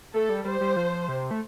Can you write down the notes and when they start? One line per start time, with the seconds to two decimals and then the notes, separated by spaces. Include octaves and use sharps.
0.14 A3 A4
0.29 G3
0.45 G3 C5
0.61 G3
0.76 F3
1.09 C3
1.31 A3